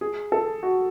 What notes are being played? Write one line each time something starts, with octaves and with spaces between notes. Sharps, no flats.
G#4
A4
F#4